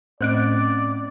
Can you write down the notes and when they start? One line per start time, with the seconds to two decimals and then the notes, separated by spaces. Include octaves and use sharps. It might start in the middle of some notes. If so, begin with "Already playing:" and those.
0.21 A2 C4 C#4 C5 D5 D#5 F#6 D7